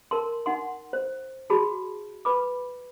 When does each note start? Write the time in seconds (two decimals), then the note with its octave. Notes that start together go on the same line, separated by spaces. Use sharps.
0.11 A#4 A5 C6
0.46 D#4 F#5 C6
0.93 C5
1.50 F#4 G#4 A5 B5
2.25 B4 B5 D6